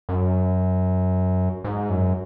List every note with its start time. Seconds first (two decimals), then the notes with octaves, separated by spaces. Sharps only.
0.09 F#2
1.64 G#2
1.90 F#2